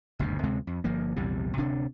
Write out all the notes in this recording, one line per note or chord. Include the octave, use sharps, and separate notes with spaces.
F#1 D2 G2 B2
D2 C3 G#3 C4
F2
G1 F3 A#3
A#1 E2 C3 G3
D1 C3 D4